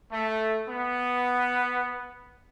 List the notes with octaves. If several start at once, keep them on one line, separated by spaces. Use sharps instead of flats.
A3
B3